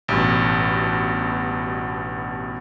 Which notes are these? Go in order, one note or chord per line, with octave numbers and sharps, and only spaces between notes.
A1 G2 B2